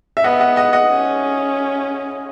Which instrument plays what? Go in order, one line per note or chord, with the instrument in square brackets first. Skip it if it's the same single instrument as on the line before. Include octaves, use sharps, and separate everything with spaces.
[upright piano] E5
[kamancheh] B3 [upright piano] D#5 F#5
[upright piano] D#5 F#5
D#5 F#5
D#5 F#5
[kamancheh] C#4